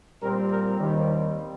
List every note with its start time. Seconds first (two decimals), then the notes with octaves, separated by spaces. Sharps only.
0.21 A#2 G3 C4 A#4
0.50 A#4
0.78 D#2 D#3 G3 C4 G4